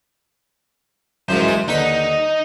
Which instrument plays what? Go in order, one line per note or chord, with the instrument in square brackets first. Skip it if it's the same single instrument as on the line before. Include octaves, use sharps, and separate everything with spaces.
[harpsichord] F#2 E3 F3 [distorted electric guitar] G#3 C5
[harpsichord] C6
[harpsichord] D#2 D3 B4 [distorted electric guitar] D#4